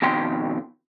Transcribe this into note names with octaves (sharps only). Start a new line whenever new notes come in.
F2 B2 D#3 G5 C6